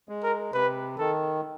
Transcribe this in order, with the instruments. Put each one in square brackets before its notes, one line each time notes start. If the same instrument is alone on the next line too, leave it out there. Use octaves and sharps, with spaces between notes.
[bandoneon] G#3
[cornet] A#4
[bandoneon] C3 [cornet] B4
[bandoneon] D#3 [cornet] A4